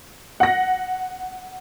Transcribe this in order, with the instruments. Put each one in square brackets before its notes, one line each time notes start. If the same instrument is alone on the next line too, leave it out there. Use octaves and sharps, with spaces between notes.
[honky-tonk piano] F#5 A#6